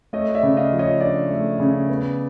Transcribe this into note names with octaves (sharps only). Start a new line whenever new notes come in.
A3 C#5 D#5
D5 E5
C#3
D#5 F5
F3
C#5 D#5
D4 D5
A3
C#3
B3